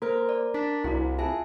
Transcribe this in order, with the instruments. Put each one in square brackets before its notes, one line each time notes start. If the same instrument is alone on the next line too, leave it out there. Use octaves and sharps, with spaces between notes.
[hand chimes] A#3 C5 F6 [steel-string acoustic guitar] A#4
[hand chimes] D5
[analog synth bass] D4 [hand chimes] B6
[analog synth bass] C2 [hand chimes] E4 F#4
[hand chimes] F4 E5 G#5 [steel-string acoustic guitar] G#4 A5